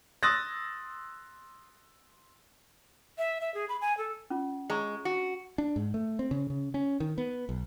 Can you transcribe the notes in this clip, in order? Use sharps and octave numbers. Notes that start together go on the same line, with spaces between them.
C6 D#6 E6 F#6 A6 A#6
E5
E5
G#4
B5
G#5
A4
C#4 F4
G#3 C#5 A#5 C#6
F#4
D4
G#2
A3
C4
C#3
C#3
C#4
D#3
B3
B1